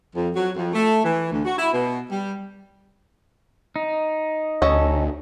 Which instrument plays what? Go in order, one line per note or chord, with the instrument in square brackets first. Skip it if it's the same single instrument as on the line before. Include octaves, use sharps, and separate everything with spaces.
[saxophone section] F2
F#3
F2
A3
E3
D2
F#4
E4
B2
G3
[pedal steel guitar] D#4
[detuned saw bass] D2 [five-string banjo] C#4 A4 D#5